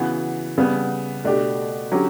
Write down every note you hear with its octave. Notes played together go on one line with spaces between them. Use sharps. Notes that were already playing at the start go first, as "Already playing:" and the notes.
Already playing: C#3 E3 B3 F#4
C#3 G3 B3
B2 A3 D4 G4
D3 F#3 C#4 G4